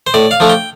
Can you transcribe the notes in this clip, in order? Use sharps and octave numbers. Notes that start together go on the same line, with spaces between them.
C5
A2 D5
F5
F3 A3 D4
G5